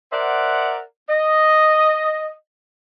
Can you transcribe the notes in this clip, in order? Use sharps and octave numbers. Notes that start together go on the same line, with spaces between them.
A#4 C5 D5 E5 F#5
D#5